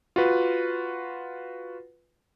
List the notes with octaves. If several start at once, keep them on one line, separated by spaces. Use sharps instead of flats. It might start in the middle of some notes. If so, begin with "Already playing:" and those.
F4 F#4 B4